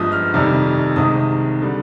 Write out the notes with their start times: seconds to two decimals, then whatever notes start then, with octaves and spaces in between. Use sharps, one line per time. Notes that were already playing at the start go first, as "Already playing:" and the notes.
Already playing: G1 G2 F3 G#3 D#6
0.12 F6
0.34 F2 C3 D#3 G3
0.96 C2 C3 D#3 G#3 D#6
1.62 D3 G3